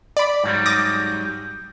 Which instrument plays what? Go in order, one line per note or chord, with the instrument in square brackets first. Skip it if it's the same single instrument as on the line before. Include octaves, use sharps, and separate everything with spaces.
[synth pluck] D5 B5
[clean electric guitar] G#2 F#3 G3
[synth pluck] D6 D#6 A#6